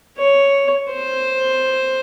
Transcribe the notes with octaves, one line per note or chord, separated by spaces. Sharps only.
C#5
C5